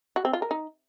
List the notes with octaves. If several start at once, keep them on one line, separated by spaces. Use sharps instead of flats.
F#4
C4
F4
A#4
D#4